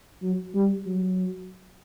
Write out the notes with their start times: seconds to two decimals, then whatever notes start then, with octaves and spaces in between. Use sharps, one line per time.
0.23 F#3
0.55 G3
0.86 F#3